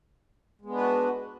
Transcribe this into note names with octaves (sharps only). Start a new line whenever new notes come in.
G#3 B3 D4 F#4 B4